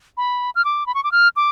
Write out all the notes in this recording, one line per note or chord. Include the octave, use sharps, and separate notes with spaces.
B5
F6
D6
B5
C#6
D6
F6
D6